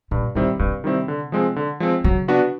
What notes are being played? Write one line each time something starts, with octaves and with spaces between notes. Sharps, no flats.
G2 A#2
A#2 D#3 G3 C4 E4
G2 C3
D#3 G3 C4 E4
D3
F3 G#3 C4
D3
F3 G#3 C4
C#3 F#3
B3 D4 F#4 B4